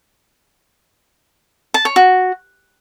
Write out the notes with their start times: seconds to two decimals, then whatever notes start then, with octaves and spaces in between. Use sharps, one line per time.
1.74 A5
1.85 C#5
1.96 F#4